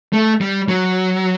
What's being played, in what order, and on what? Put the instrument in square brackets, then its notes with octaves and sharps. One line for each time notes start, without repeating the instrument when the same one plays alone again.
[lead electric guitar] A3
G3
F#3